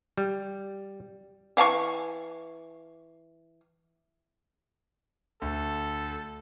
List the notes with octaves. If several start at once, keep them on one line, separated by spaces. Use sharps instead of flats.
G3
E3 F5 A5 C#6
D2 A4